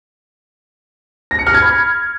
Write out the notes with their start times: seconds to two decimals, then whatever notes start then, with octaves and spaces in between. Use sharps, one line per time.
1.31 A#6
1.39 C#7
1.47 F6
1.54 G#6
1.62 B5